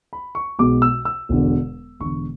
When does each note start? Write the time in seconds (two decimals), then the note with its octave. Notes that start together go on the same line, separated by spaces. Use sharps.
0.13 B5
0.35 C#6
0.59 B1 B2 G#3 D6
0.82 E6
1.05 E6
1.29 E1 E2 D3
2.00 E1 E2 D3 C#6